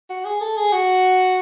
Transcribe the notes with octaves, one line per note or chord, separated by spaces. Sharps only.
F#4
G#4
A4
G#4
F#4